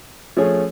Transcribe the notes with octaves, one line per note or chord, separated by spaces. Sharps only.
F3 A3 C#4 G#4 C#5